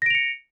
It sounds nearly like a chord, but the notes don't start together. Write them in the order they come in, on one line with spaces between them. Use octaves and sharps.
A#6 D7 F7 C#7